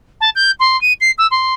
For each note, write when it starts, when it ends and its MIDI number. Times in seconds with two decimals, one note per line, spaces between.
0.20 0.30 81
0.35 0.51 91
0.60 0.79 84
0.81 0.93 99
1.00 1.11 96
1.18 1.27 88
1.31 1.54 84